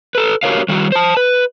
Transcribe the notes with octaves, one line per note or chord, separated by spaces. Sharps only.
A4 B4
F#4 G4 A4 A#4 C#5 F5
D#3 G3 F#4
C5 A5
B4